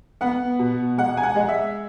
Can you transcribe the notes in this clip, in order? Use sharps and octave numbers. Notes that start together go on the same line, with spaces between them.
B3 F#5
B2
G#3 F#5
G#5
F#5
G#3
E5